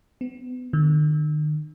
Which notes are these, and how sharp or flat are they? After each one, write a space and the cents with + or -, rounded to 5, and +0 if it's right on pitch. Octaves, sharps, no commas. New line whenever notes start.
B3 +30
D#3 -45